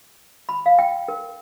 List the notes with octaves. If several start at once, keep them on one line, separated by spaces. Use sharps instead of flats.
B5
F5
G5
A#4